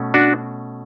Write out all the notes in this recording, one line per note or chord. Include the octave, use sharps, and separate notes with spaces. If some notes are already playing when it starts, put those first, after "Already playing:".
Already playing: B2 A3 C#4
D4 F#4